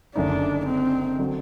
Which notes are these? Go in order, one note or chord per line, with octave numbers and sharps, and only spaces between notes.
F#1 F#2 D3 A3 D4 D#4
C4
D3 F#3 C4